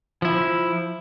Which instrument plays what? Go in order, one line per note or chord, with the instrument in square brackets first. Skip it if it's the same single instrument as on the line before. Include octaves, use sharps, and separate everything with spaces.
[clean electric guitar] F3 E4